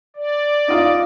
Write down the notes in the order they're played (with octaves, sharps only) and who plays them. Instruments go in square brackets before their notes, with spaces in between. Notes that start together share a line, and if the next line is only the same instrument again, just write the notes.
[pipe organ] D5
[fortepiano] D#4 F4